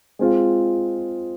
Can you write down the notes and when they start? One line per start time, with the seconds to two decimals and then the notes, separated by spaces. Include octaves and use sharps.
0.19 G#3 C4 F4